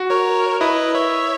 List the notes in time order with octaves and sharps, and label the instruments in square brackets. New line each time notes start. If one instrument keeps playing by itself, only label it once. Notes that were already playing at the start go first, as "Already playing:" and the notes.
Already playing: [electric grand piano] F#4
[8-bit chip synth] A#4 C#5
[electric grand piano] E4 [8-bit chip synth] B4 D#5
[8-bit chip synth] C#5 E5